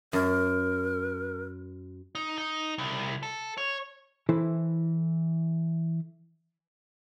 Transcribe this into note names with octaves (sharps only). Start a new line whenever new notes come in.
F#2 A#4
D#4
D#4
C2
A4
C#5
E3 E4 A4 C5